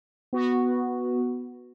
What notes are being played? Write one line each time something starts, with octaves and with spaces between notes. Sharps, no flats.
B3 F#4